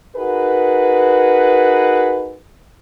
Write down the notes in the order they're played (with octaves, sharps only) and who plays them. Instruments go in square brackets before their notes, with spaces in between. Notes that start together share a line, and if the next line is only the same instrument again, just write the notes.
[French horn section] D#4 F#4 G#4 A#4 B4